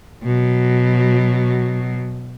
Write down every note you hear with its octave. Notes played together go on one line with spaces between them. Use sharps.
B2 F#3